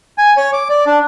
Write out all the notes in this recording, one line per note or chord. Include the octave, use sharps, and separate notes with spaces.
G#5
C#5
D6
D5
D4